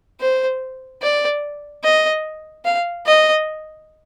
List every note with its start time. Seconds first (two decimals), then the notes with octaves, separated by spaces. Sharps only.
0.20 C5
1.02 D5
1.84 D#5
2.65 F5
3.07 D#5